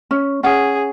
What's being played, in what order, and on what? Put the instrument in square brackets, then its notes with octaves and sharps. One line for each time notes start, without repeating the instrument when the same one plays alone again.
[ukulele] C#4
[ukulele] C#4 F#5 [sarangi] G#4